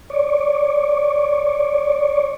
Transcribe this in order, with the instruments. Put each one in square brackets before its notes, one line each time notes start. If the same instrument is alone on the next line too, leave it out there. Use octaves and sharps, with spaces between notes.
[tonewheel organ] C#5 D5